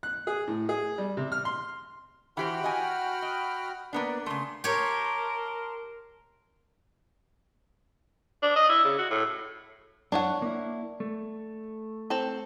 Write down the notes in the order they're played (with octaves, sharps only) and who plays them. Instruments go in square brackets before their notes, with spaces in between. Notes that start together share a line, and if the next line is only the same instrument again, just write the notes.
[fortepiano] F#6
G#4
A2
G#4
G3
C3
F6
C6
[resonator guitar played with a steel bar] E3 G4 C5 [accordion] F#4 G5 F6 [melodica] F#5 B5
[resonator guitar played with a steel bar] D#5 G#5
D#5
[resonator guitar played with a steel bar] A#3 B3 D4 [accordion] D5
[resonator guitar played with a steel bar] C#3 A3 [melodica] C6
[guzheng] G4 C#5 [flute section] A#4 A5 C6
[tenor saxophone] D4
D#5
E4
C#3
F#4
A2
[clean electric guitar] F#2 [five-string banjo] D4 C#5 F#5
[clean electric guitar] A#3 E4
A3
[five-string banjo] C4 A4